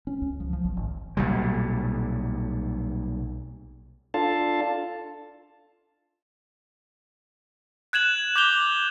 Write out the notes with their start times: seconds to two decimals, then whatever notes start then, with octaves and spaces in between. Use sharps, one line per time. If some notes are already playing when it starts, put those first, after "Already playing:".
0.07 C#4
0.22 C#2
0.40 F3
0.53 F3
0.65 B1
0.77 G#1
1.17 B1 A#2 G3
4.14 D4 F4 A4 F5 A5
7.93 F#6 G#6 E7 F#7
8.36 D6 G6 F7 G7